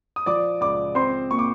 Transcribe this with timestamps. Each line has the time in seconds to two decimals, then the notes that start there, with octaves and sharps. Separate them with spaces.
0.16 D#6
0.26 F3 D5 D6
0.61 C#2 D5 D6
0.95 C4 C5 C6
1.31 A#2 C#6
1.39 D6